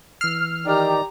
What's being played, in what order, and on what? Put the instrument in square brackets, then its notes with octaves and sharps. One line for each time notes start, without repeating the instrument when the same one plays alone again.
[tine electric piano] E3 E6 C7 [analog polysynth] F6
[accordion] D#3 D#4 D5 [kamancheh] G4 A#5